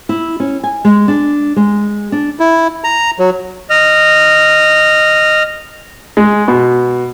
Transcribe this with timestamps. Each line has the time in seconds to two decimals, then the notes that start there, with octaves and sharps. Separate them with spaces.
0.09 E4
0.40 C#4
0.64 G#5
0.85 G#3
1.08 D4
1.56 G#3
2.12 D4
2.39 E4
2.84 A#5
3.19 F#3
3.70 D#5 F6
6.17 G#3
6.48 B2